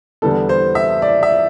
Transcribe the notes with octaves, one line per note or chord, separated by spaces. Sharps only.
E2 D3 G3 B3 A4
C5
E5
D5
E5